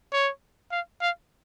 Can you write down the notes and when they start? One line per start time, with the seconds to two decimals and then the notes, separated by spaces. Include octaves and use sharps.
0.12 C#5
0.71 F5
1.01 F5